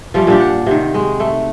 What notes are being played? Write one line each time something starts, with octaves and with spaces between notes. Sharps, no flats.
F3 G3 A3 C#4
A#2 G3 D4 G4
F#5
C3 D#3
G#3
A3